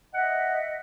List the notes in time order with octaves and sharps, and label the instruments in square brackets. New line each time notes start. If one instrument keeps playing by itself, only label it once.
[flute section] D#5 E5 [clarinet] F#5